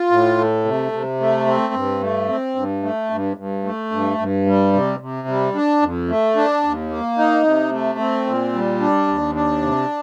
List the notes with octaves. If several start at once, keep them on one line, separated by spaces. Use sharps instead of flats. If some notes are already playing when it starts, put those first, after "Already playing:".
Already playing: F4
A2
A3
C3
C3
A3
C4
G2
A3
C4
G2
A3
G2
G2
A3
G2
G2
G3
C3
C3
G3
D4
F2
A3
D4
D#2
A#3
D#4
C3
A3
C4
A#2
G3
D4
D#2
D4
C3